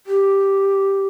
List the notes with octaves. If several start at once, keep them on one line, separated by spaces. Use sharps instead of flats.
G4